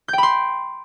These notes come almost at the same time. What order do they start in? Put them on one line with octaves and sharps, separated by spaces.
G6 G5 B5 C6